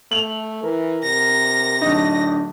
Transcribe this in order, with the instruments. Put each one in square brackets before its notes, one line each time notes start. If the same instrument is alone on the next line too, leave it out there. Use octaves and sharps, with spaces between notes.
[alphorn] A3 [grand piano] F7 F#7
[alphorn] E3 [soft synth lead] A#4
[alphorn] C3 [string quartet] A#6
[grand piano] D1 D#4 [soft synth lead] D4